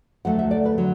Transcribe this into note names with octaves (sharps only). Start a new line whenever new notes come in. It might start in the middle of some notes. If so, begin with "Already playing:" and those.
D2 D3 F#3 A3 F#5
E5
D5
B4
D3 F#3